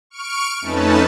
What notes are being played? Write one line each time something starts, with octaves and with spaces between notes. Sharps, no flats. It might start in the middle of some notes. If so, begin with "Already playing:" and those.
C#6 F6 D7
F2 A3 C#4 D#4 B4 A5